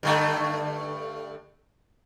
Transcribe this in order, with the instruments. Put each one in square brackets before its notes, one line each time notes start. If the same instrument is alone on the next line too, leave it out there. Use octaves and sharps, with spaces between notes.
[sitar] G2 D3 A3